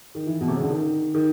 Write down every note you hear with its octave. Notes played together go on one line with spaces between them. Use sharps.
D#3
E3
B2
C3
C#3
D3
D#3
D#3